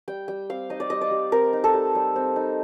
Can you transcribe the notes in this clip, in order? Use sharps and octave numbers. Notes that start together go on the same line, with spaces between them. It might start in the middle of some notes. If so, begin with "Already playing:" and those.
G3 G5
G3 G5
C4 F5
D#4 D#5
D5
G3 D#5
D5
G3
C4 A#4
D#4
A4
G3
G3
C4
D#4